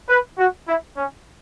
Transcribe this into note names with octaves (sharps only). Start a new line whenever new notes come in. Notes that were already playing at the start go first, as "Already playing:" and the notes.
B4
F#4
E4
C#4